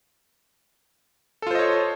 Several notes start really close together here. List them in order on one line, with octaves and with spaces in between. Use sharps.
A4 F4 C5 D#5 C#5